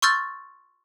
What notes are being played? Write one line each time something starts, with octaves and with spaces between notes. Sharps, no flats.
C6 C#6 E6 F6 G6 A6